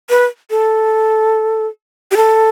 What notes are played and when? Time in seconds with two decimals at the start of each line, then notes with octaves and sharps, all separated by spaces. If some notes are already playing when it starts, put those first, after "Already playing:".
0.10 B4
0.50 A4
2.11 G4
2.16 A4